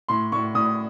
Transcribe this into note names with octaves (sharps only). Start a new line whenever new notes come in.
A2 C6
A2 C#6
A2 D#6